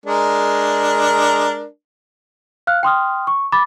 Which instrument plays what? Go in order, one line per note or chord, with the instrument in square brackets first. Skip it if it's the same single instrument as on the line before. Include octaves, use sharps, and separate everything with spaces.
[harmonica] G#3 D4 A#4
[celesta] F5 F6 F#6
G5 C6 D#6 F6
C#6
B5 D6 A6